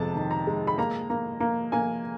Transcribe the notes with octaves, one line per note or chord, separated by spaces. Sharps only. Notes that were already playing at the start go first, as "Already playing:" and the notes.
Already playing: F2 C3 G#3 A5
D#3
A#5
G#3
B5
A#3 A#5
A#3
A#3
A#3 G#5